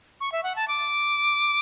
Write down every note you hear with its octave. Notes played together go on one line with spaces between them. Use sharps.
C#6
E5
F#5
A5
D6